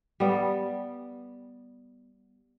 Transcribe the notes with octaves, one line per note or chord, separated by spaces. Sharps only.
G3 B3